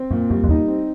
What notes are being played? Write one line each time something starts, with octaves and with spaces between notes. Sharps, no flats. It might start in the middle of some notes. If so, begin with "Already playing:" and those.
Already playing: C4
F#2 A#2
F#2 G3
F2
E2 D#4
C4